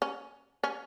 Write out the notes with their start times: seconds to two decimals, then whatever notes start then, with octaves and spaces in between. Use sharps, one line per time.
0.02 C#4
0.64 C#4